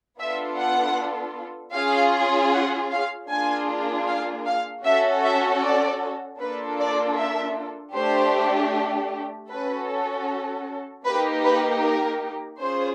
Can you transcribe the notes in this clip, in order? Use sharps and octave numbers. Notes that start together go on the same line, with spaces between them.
B3 D4 F4 A4 E5
F#5
C#4 F4 G#4 F5
F#5
F5
A#3 D4 F4 G#4 G#5
F5
F5
C#4 F#4 A4 E5
E5
D5
A#3 D4 F4 A4 B4
D5
E5
A3 D4 G4 C5
C#4 F#4 A4 B4
A#3 D#4 G4 B4
B4
A#4
C#4 F4 G#4 C5